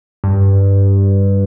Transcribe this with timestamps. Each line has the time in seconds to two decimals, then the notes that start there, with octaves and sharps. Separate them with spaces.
0.24 G2